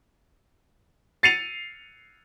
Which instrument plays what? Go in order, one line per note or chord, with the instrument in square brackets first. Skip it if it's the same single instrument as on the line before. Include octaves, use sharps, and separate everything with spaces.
[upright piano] A6 C7 C#7 D#7 F7